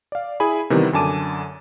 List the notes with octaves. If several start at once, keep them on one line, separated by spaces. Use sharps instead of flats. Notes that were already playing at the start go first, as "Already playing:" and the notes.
D5 F5
E4 G#4 G#5 B5
C3 D#3 E3 G3 B3
F#2 D3 G#5 A5 D6 D#7